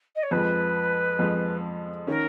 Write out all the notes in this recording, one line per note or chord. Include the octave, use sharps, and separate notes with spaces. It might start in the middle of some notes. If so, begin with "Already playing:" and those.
D#5
C#5
F2 F3 G#3 B4
F2 F3 G#3
D#3 A#3 C#4 A#4